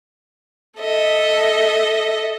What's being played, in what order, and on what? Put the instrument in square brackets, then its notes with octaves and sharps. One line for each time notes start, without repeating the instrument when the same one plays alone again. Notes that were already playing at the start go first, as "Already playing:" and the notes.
[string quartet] A4 D#5 E5